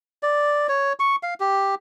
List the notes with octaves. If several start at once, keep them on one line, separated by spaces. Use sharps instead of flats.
D5
C#5
C#6
F5
G4